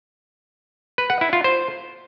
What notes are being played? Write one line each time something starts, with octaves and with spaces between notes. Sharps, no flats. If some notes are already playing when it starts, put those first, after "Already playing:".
B4
F#5
E4
F4
C5